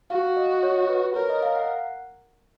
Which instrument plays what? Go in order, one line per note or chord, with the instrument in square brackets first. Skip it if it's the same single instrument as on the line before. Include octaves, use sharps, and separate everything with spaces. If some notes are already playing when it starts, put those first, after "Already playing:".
[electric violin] F#4 [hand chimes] F5
[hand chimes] D#5
D#5
C#5
B4
[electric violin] A#4 [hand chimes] C#5
[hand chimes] D#5
F5
F#5